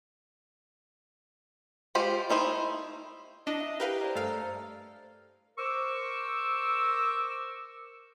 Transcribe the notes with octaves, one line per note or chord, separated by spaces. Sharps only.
G#3 F4 G4 C5 B5
A3 D#4 E4 C5
D4 E4 D#5
E5
G4 A#4 B4 F5
C5 D5 A#5
G2 A3 A4 C5 F5 F6
A#4 C5 C#6 D6 E6